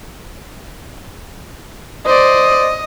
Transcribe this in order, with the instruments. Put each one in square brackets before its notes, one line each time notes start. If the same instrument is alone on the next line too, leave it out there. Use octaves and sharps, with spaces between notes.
[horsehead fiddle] C5 D5 [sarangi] D#5